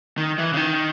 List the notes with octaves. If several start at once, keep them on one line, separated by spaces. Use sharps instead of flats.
D#3
E3
C#3
D#3